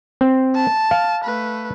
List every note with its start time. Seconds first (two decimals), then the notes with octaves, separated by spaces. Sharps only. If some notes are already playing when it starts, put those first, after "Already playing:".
0.21 C4
0.55 A5
0.91 F5
1.24 A3 B4